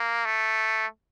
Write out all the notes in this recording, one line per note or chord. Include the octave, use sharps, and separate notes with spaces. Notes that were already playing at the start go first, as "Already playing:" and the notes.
Already playing: A#3
A3